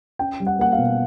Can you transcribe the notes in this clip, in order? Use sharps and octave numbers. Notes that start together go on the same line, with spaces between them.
C#4 G5
G3
F#5
A#3 F#5
F5
B2